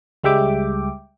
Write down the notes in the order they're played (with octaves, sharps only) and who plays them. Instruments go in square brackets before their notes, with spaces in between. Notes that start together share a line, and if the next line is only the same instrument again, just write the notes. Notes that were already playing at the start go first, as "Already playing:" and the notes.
[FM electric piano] C#2 G3 G#3 E5 G5 D6